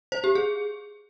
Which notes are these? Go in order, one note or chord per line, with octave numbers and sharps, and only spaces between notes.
C5
G4
G#4